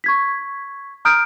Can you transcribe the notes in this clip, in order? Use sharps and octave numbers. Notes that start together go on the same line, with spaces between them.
C#6 G#6 B6
A#5 D#6 F6 G6 D7